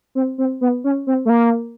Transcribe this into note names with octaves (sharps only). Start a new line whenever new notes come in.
C4
C4
B3
C#4
C4
A3
A#3